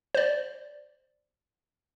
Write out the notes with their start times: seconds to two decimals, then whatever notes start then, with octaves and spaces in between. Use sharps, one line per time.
0.15 C5 D5